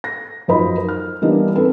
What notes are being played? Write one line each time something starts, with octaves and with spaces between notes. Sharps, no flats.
A#6
F#2 F3 D#4 C5 D#5 B5
F6
E3 G3 A#3 B3 D4 D#4
C4 A4 B4